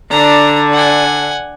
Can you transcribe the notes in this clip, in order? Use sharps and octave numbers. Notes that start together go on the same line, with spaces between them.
D3 D4 A#5
F#5 G#5